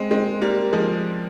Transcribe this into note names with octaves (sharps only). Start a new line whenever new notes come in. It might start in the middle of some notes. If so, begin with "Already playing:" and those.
Already playing: G#3 C4
G#3 C4
G3 A#3
F3 G#3